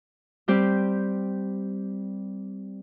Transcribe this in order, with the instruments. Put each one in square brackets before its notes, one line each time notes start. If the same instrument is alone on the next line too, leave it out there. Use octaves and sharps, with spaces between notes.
[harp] G3 C4 G4